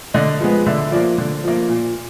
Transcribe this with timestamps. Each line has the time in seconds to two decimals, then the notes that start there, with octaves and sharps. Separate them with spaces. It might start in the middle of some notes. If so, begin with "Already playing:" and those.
0.14 D3 D#5
0.40 F3 G#3 B3
0.66 D3 E5
0.91 F3 A#3 D5
1.18 D3
1.44 F3 A#3
1.68 A#2